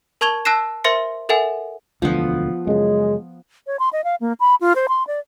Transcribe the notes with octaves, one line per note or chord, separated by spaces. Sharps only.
A#4 A5 C#6 G#6 F7 G7
A5 E6 F#6 A#6 C7 E7
A#4 C5 E5 C6 A#6 C#7
A4 A#4 E5 F#5 G#5
E1 D2 D3 F3 B3
F#2 C#3 G#3
C#5
C6
D#5
F5
A#3
B5
F4
C5
C6
D5